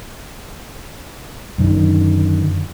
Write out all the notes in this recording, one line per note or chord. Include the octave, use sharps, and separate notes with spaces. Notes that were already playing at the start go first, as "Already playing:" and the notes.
F#2 D3 D#3